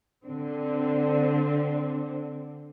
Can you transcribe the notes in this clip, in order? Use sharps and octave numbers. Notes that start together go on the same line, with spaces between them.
D3 C4